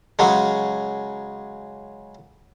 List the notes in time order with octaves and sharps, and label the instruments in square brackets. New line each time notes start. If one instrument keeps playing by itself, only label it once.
[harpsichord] C#3 F#3 G#3